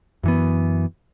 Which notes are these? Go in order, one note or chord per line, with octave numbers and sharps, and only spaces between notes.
F#2 E3 B3